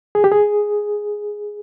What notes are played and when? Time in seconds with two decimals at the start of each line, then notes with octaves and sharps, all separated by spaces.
0.15 G#4
0.24 G4
0.32 G#4